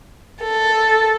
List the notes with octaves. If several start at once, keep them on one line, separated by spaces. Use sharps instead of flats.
A4